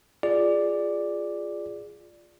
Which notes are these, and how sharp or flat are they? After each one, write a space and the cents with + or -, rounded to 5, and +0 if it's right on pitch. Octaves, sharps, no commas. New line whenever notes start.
F4 +0 G#4 -5 D5 +0